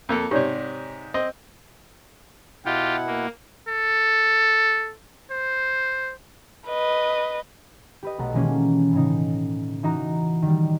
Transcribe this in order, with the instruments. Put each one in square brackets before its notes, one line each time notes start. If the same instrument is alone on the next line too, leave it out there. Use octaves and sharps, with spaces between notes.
[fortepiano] F2 A#3 A4
[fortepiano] G#2 C3 [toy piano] G4 C#5 D5
[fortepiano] C4 D#5
[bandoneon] B2 E4 F#5 [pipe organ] F4 G4
[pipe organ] A#3
[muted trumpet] A4
C5
[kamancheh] B4 D#5
[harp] G4 B4 D#5
B1 A3 F#5 A#5
B2 D#3 E3 G#3 A#3 C#4
A2 C#3 D#4
E3 D#4 F#4 A#5
D#3 G3